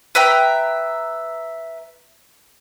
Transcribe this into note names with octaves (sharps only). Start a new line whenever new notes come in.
B4 E5 G5 A#5